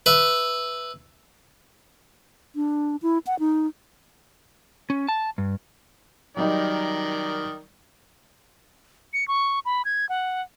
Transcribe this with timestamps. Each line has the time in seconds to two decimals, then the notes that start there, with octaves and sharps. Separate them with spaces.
0.06 B4 E5
2.56 D4
3.02 E4
3.27 F#5
3.39 D#4
4.90 C#4
5.09 A5
5.38 G2
6.37 D#3 F#3 G3 D#4 A#4 D5
9.13 C#7
9.28 C#6
9.65 B5
9.85 G#6
10.09 F#5